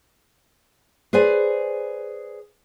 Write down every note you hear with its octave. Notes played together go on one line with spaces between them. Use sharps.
G#4 B4 C5 D5 G#5